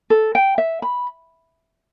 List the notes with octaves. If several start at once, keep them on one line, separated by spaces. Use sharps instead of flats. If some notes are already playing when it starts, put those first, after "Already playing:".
A4
G5
E5
B5